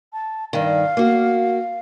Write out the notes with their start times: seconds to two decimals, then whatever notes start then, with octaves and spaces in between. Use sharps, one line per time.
0.13 A5
0.53 G2 D#3 F5
0.97 A#3 F#4